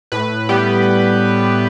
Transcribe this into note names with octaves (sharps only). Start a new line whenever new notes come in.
A2 B4
G3 B3 G4